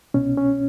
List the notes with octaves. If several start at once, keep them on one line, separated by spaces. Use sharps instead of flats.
C2 B2 C#4
C#4